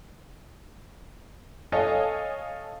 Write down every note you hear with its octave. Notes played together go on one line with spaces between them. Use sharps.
A4 C#5 D#5 F5 G#5